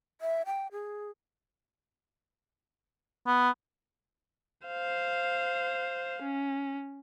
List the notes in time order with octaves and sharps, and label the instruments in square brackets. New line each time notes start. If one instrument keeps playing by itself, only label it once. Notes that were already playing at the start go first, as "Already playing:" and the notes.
[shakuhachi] E5
G5
G#4
[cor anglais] B3
[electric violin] C5 F5
C#4